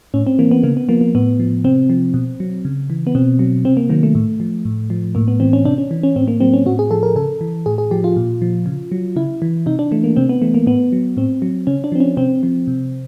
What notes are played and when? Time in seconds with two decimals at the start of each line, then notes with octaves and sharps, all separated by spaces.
0.14 A2 C#4
0.27 C4
0.39 E3 A#3
0.51 B3
0.63 C#3 A#3
0.77 B3
0.89 F3 A#3
1.01 A#3
1.15 A2 B3
1.40 F3
1.64 C3 C4
1.90 F3
2.14 B2
2.40 F#3
2.65 C#3
2.90 E3
3.07 B3
3.15 B2 C4
3.39 F#3
3.65 C3 C4
3.77 A#3
3.89 D#3 F#3 A#3
4.03 A3
4.15 A2
4.40 F3
4.65 A2
4.90 F3
5.15 A2 A#3
5.28 B3
5.40 E3 C4
5.53 C#4
5.65 C3 D4
5.78 C#4
5.91 E3
6.03 C#4
6.16 A2 C4
6.28 A#3
6.40 F#3 C4
6.53 C#4
6.66 A2 F#4
6.79 G#4
6.91 F3 A4
7.03 A#4
7.16 C#3 A4
7.41 E3
7.66 A2 G#4
7.78 G#4
7.91 F3 G4
8.04 F4
8.17 A#2
8.42 F3
8.66 C#3
8.92 F#3
9.16 C#3 E4
9.42 E3
9.66 C3 D#4
9.79 D4
9.91 E3 A3
10.04 A#3
10.16 C3 C4
10.29 B3
10.42 E3 A3
10.54 A#3
10.67 A2 B3
10.92 F#3
11.17 A2 C4
11.42 F#3
11.67 C#3 C#4
11.84 D4
11.92 F3 C4
12.00 C#4
12.17 C3 C4
12.43 F3
12.68 C3